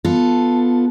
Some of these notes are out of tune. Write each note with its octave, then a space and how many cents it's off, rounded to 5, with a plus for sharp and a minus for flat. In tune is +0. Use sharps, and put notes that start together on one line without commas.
B3 +0 F4 +0 A4 +0